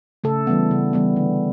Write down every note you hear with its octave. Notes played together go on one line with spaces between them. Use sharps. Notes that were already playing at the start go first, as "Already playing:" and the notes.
C#3 A3 A4
E3 G3 B3
C#3
E3 G3 B3
D3